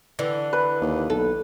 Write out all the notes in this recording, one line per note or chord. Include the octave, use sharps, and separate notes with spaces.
D3 E3
B4
D#2
B1 A4